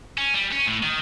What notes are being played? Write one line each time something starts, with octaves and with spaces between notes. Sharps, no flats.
C#4
G3
C#4
A2
D#3